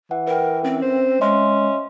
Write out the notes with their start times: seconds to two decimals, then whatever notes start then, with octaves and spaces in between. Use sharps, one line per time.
0.11 E3 F#5
0.28 A#4 B4 G5
0.64 C4 C#4
0.82 C5
1.21 G#3 C#4 D#5 E5 C6